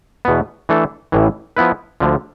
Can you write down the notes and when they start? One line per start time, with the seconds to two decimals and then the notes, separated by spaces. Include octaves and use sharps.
0.25 E2 B2 B3
0.69 E3 A3 D4 A4
1.12 A1 A2 E3
1.57 F3 B3 E4 B4
2.00 D2 D3 F3